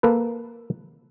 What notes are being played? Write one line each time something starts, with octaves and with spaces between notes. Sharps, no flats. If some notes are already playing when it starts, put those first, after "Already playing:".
A#3 A4 B4